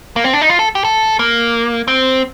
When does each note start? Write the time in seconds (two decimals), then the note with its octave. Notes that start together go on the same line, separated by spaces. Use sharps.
0.16 A#3
0.24 C4
0.33 D4
0.41 D#4
0.50 F4
0.59 A4
0.75 G4
0.85 A4
1.19 A#3
1.88 C4